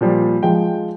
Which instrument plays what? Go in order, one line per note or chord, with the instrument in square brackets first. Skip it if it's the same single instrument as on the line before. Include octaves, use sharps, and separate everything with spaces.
[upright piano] A#2 F3 G3
[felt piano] F3 G#3 [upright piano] G5